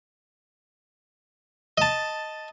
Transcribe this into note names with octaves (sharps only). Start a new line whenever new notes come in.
D#5 A5